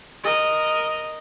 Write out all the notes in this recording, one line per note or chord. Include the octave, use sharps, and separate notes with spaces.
A#4 D#5